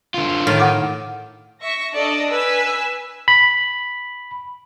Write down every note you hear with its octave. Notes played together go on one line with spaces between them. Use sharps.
D3 F4
A2 D#3 F4
A#4 F#5 D6
E5 C#6 A#6
D4 A4 D5 D#5
B4 G#5 E6 B6
B5